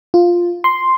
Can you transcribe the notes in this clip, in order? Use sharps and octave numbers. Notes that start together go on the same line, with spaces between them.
F4
C6